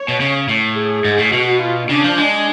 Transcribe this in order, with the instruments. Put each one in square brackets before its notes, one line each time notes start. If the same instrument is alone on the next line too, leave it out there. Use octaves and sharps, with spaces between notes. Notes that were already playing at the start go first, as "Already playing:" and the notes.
Already playing: [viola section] C#5
[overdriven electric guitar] B2
C#3
A2
[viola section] G#4
[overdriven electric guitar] G#2
A2
[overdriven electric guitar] B2 [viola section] F#4
[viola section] F4
[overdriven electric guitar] C#3 [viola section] D4
[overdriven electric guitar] F3
G#3